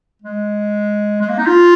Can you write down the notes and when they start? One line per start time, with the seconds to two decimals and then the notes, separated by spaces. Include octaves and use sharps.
0.22 G#3
1.21 G#3
1.29 A#3
1.38 D#4
1.46 F4